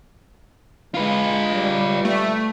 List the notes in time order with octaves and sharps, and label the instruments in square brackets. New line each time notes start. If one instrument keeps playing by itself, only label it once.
[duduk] G#3 [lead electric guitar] F4 B4
[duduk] G3
[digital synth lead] A3